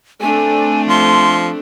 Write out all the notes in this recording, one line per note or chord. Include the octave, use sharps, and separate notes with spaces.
A3 C4 D4 G#5
F3 C6